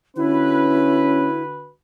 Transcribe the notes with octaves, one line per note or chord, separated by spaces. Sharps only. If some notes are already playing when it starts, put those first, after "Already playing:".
D3 C#4 E4 F#4 B4